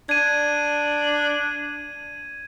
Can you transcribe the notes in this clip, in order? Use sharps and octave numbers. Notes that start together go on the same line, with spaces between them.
D4 G#6 D#7